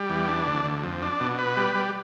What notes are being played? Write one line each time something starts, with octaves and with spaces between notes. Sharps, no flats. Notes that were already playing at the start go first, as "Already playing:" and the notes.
Already playing: G3
E2
D4
D2
D2
F2
D4
B2
B4
G3
G3